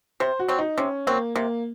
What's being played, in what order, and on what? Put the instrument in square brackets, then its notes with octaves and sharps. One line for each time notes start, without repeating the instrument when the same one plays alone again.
[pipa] C3 [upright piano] C5
[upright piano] F#4
[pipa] F#3 C4
[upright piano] D#4
[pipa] C3 [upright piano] C#4
[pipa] F#3 C4 [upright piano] A#3
[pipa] C3 [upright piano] A#3